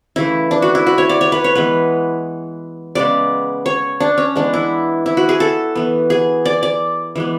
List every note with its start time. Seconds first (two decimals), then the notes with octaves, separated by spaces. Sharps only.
0.16 C#3 E3 A3 E4
0.51 D4
0.62 F#4
0.75 E4
0.87 F#4
0.98 C#5
1.09 D5
1.21 C#5
1.32 B4
1.44 C#5
1.55 E3 G#3 B3 B4
2.95 C#3 G#3 B3 D5
3.66 C#5
4.00 D4
4.18 C#4
4.35 E3 G#3 B3 D4
4.54 E4
5.06 E4
5.17 F#4
5.29 G#4
5.40 A4
5.75 E3 B3
6.10 G#4
6.45 D5
6.63 D5
7.16 E3 G#3 B3